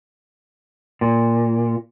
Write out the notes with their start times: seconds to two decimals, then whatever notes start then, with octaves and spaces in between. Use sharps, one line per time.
1.01 A#2